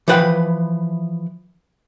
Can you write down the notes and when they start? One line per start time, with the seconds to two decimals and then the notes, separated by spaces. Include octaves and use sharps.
0.08 E3 F3 B4 F#5 G5